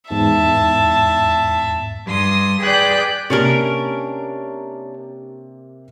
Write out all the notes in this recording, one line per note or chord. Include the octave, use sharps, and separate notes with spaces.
E2 G#2 E5 A5
G2 C6 D#6
G#4 B4 D5 G5 F#6 G6
C3 A#3 C#4 D4 G4 A#4